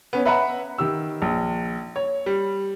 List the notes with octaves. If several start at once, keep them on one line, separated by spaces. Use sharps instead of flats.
B3 C#4
B4 E5 F#5 A#5 B5
D#3 G4 E6
A#1
C#5
G3